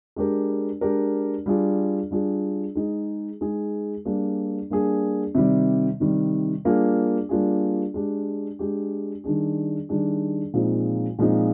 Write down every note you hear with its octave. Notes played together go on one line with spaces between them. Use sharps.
G#3 D4 G4 A#4
G#3 D4 G4 A#4
G3 D4 F4 G#4
G3 D4 F4 G#4
G#3 D#4 G#4
G#3 D#4 G#4
G3 A#3 D4 G#4
G3 A#3 D4 G#4
C3 D#3 G3
C3 D#3 G3
G3 A#3 D4 F4 G#4
G3 A#3 D4 F4 G#4
G#3 D4 G4
G#3 D4 G4
D#3 G3 D4 G#4
D#3 G3 D4 G#4
A#2 F3 G#3 C4 D#4
A#2 F3 G#3 C4 D#4